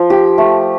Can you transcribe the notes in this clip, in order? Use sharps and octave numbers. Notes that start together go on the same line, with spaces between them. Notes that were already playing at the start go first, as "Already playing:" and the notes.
Already playing: F3
G4
A3